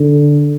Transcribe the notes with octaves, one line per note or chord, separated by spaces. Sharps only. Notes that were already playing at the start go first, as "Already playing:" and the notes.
Already playing: D3